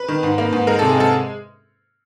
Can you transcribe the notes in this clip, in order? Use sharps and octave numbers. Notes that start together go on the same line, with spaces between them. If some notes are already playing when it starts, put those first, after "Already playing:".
Already playing: B4
D#3
G#2
A#3
G#2
G#3 A#4
C3 A4
G#4
G#3 A4